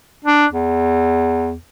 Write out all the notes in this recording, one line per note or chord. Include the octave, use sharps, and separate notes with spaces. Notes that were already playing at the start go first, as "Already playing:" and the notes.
D4
E2